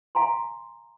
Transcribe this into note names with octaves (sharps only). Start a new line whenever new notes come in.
F5 G#5 A#5 C6